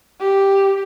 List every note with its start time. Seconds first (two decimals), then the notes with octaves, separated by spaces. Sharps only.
0.19 G4